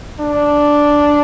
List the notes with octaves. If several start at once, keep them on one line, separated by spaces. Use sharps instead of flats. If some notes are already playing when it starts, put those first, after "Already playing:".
D4